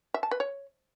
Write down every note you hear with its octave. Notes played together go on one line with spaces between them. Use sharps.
E5
A5
B4
C#5